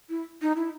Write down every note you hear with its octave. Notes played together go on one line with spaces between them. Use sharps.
E4
D#4
E4